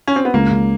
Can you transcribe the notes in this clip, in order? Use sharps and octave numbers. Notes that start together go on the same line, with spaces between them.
C#4
C4
B3
C#2 A#3
C#3